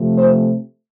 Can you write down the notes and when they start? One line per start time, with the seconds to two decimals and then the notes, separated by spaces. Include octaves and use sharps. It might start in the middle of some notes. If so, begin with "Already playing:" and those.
Already playing: C3 F3 A3
0.18 C5